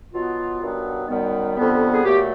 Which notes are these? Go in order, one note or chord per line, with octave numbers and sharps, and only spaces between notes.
B2 F#3 B3 F4
G2 D#3 F#3 B3
F#2 D#3 G3 B3
F2 D3 G3 B3
G#4
A#2 F#3 A3 G4